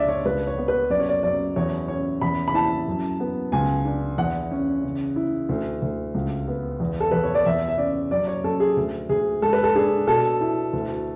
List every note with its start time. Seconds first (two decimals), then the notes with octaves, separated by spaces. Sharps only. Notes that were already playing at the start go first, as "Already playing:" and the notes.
Already playing: C#2 D4 D5 E5
0.09 C#5
0.25 C#2 B4
0.47 C#5
0.58 B3
0.68 B4
0.90 F#2 D5
1.00 C#5
1.09 D5
1.23 F#2 D5
1.56 E2 C#5
1.88 C#4 C#5
2.21 E2 B5
2.48 B5
2.54 E4 A5
2.88 F#2
3.20 B3
3.52 C#2 G#5
3.85 D4
4.18 E2 F#5
4.51 C#4
4.84 C#3
5.16 E4
5.49 D2
5.82 D2
6.14 C#2
6.48 B3
6.80 E2
7.00 A4
7.11 E2 B4
7.24 C#5
7.35 D5
7.46 E2 E5
7.68 E5
7.78 C#4 D5
8.11 F#2 D5
8.27 C#5
8.44 F#2 A4
8.60 G#4
8.77 D2
9.09 D2 G#4
9.42 G#2 A4
9.53 B4
9.64 A4
9.75 D4 G#4
10.07 B2 A4
10.41 E4
10.73 D2